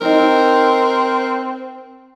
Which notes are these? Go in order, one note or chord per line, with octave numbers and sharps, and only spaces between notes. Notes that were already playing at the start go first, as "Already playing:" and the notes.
C4 C#4 D#4 A#4